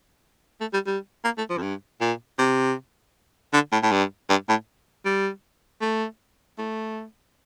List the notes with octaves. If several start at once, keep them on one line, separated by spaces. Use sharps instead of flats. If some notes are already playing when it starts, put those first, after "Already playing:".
A3
G3
G3
A#3
A3
F3
F2
G2
A#2
C3
D3
A2
A2
G2
G2
A2
G3
A3
A3